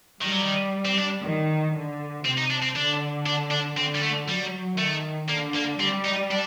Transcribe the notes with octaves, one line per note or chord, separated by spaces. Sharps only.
D#3 G3
F#3
D#3
C4
D4
D#3
D3
C3 C4
D#4
D4
C4
D3 D4
D4
D4
D3 C4
G3
A3
F#3 G3
D#3 A3
D3 A#3
A#3
G3 C4
D#4
D4